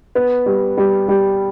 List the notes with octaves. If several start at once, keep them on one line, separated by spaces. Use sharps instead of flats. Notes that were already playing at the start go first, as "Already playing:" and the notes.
B3
G3
G3
G3